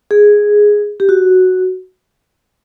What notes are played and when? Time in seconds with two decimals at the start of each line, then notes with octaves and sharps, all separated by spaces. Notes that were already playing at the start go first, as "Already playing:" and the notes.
0.11 G#4
1.00 G4
1.09 F#4